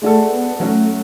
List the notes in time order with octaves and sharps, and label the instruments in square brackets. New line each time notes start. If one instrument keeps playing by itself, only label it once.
[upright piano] G#3 D4 F#4 A4 [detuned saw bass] A3
[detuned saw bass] B3
[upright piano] F#3 C#4 F#4 [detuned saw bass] A3